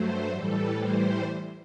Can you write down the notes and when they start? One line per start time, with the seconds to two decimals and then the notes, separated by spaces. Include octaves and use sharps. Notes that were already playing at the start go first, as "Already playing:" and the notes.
Already playing: G2 F#3 A3 C5
0.28 A2 E3 G3 A4
0.75 C5